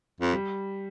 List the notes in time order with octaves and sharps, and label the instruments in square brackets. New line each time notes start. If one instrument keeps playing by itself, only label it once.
[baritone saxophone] F2
[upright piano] G3